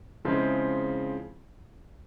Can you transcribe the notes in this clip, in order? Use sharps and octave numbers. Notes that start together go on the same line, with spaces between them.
C#3 F3 G#3 C4 E4